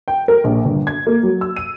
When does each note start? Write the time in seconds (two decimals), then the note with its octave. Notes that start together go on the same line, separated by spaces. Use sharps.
0.08 G5
0.28 A#4
0.44 A#1
0.65 G1
0.87 G#6
1.07 A#3
1.23 F#3
1.41 E6
1.56 D#7